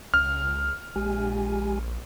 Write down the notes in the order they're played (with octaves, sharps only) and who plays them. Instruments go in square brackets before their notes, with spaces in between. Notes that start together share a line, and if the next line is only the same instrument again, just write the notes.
[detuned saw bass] C#2 [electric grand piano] F6
[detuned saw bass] A#1 [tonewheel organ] G#3 G4 G#5